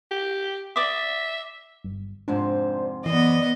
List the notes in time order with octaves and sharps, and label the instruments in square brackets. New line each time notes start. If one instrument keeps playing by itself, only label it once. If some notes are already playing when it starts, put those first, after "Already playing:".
[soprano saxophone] G4
[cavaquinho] D5 D6 D#6 [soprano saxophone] E5
[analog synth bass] G1
[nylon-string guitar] F2 G#2 C3 [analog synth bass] D4 [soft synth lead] C5
[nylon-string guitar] F#2 C5 [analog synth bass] E3 [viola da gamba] B3 D#5 [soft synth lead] D5